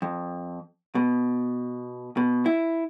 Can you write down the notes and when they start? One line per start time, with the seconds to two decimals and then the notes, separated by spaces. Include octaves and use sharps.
0.02 F2
0.95 B2
2.17 B2
2.46 E4